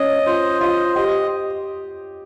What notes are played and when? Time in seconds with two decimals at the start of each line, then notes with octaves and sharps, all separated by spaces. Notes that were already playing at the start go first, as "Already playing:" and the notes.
Already playing: C#4 D#5
0.26 F4 C5
0.61 F4 D#5
0.96 G4 D#5